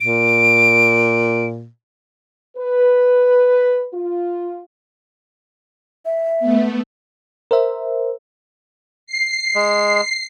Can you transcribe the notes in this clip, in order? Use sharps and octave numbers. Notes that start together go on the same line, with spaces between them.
A#2 D7
B4
F4
E5
A3 B3
A#4 C5 E5
C7
G#3